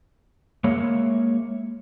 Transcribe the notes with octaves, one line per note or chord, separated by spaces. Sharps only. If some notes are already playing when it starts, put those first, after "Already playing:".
G#3 A#3 C#5 E5